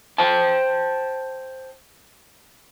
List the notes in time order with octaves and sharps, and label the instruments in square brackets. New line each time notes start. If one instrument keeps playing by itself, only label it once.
[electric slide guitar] C5 G5 A5